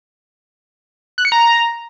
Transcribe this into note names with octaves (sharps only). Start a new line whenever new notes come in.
F#6
C#7
A#5